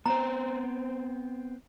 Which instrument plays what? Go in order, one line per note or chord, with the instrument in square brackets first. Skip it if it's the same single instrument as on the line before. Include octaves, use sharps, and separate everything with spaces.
[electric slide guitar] B3 C4 C5 [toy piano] A#5